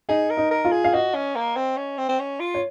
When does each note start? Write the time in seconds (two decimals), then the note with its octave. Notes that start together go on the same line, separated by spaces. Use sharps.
0.09 D#4 G#4
0.30 A#4
0.37 D#4
0.51 A#4
0.65 F4
0.71 G#4
0.84 F5
0.93 F#4 D#5
1.14 C#4
1.36 A#3
1.56 C4
1.76 C#4
1.98 C4
2.09 C4
2.19 C#4
2.40 F4
2.54 C#5